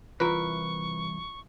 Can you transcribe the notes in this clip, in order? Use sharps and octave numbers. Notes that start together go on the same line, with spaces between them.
C2 E3 F4 A#4 B4 C#6